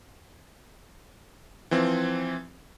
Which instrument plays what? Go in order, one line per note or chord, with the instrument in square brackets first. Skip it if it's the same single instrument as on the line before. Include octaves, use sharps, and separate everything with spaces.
[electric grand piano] E3 F3 C4